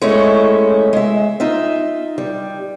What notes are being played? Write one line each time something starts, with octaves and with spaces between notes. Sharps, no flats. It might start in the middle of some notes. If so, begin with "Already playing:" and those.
G#3 A3 C#4 E4
G#3 E5
D#4 F4 E5
G3